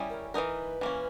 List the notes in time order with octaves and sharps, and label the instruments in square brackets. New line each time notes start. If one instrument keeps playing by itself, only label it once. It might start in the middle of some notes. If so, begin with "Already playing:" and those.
Already playing: [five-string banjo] G3 C#4 E4 G#4
[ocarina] A#4
[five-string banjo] E3 G#3 D#4 A#4 [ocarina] B4
[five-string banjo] E3 A#3 C#4